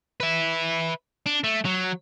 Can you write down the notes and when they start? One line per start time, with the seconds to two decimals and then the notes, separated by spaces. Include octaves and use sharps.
0.20 B4 E5
1.26 D4
1.44 A3
1.65 F#3